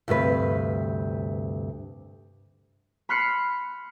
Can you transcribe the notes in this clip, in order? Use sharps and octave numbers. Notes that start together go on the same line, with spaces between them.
D2 G2 C3 B4
B5 C6 F6 F#6 C7 C#7